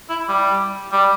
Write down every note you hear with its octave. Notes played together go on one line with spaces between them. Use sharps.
E4
G3
G3